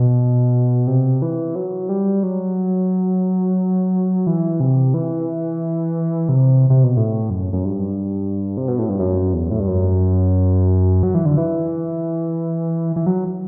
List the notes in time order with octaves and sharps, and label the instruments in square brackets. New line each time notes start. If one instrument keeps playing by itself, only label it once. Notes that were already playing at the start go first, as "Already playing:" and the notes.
Already playing: [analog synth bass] B2
C3
E3
F#3
G3
F#3
E3
C3
E3
C3
C3
B2
A2
F#2
F#2
G2
C3
B2
A2
G2
F#2
E2
A2
G2
F#2
F#3
E3
D3
E3
E3
F#3